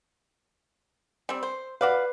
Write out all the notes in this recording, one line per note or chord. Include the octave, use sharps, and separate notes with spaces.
G3 C4
C5
F#4 B4 D5 F5